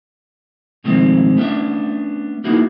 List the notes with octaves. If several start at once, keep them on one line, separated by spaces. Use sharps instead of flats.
B2 D#3 F3 G#3 A3 C4
A3 B3 C#4 D4 E5
A#3 B3 D#4 E4 F#4 G#4